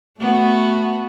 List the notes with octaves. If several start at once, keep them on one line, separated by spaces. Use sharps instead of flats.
A3 B3 F#4